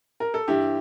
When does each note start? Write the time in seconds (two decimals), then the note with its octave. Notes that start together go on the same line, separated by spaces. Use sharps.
0.20 A#4
0.34 A4
0.48 G2 E3 E4 G4